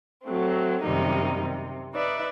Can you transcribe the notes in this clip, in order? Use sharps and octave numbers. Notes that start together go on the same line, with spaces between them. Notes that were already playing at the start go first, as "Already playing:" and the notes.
F#3 A3 C4
F#2 C3 D#3 G3 A#3 D#4
C3
D#4 B4 D5 E5